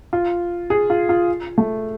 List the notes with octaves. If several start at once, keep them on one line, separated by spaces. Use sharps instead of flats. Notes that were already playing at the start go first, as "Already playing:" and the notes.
F4
G#4
F4
F4
A3